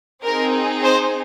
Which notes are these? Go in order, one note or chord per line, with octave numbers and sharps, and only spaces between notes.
C4 D#4 G#4 A#4
C5